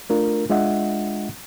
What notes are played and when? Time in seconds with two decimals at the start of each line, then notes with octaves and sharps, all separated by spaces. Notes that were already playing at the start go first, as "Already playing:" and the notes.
0.10 A3 D4 F4 A#4
0.50 G#3 D4 F4 D#5 E5 F#5